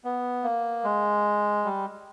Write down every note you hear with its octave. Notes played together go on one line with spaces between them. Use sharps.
B3
A#3
G#3
G3